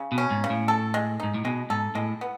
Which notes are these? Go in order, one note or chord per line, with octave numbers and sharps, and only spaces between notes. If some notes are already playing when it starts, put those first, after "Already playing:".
Already playing: C#3
B2
C#4
G#2
C#3
A2
A4
G#3
G#2 D#4
A2
B2 G#3
G#2 A4
A2 G#3
B3